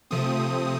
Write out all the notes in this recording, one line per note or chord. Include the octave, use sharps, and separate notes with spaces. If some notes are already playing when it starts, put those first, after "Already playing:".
C3 F3 A3 C4 D#6